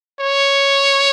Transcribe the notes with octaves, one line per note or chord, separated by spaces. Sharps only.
C#5